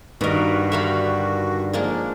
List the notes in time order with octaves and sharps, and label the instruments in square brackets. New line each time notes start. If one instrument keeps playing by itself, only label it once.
[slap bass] G2 [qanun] D#3 A#4 [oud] B3 D#4 [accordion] F#4
[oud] D3 D#3 [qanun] E5 F5 B5
[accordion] F3 [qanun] G#3 A#3 D4